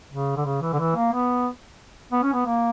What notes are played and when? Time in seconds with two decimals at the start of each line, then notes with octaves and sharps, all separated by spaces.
0.12 C#3
0.36 D3
0.45 C#3
0.62 E3
0.73 D3
0.79 E3
0.96 A#3
1.13 B3
2.12 B3
2.23 C#4
2.33 B3
2.46 A#3